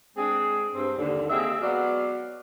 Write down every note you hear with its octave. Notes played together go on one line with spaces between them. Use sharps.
G#3 C4 D4 G#4
G2 C4
D#2 D3
A#3 C4 G4 G#4 D#5 E5
F#3 G#3 B3 F#4 D5 F5